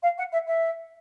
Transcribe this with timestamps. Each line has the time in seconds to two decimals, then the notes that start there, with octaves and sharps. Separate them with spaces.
0.02 F5
0.17 F#5
0.32 E5
0.47 E5